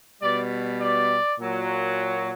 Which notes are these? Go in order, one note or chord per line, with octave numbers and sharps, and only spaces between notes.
B2 G3 D5
D5
A#2 F#3